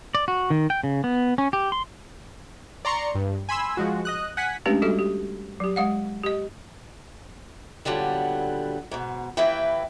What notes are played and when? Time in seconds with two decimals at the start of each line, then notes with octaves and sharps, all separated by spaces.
0.15 D5
0.28 F#4
0.50 D#3
0.70 G5
0.84 C#3
1.04 B3
1.38 C#4
1.53 G4
1.72 C6
2.85 D5 A#5 C6 C#6 C#7
3.15 G2
3.49 G#5 B5 C6 E6
3.77 F3 G#3 F#4
4.05 D#5 D#6 F#6
4.37 F#5 G#5 B6
4.66 G#3 A3 C#4 D4 G4 B4
4.82 G3 F#4 A4 E5
4.99 G4
5.60 F#3 G4
5.76 G#3 F5 F#5
6.24 G4 D#5
7.85 A#2 D3 F#3 G3 B3
8.91 G#2 B2
9.37 D#2 E3 E4 B4 E5 G5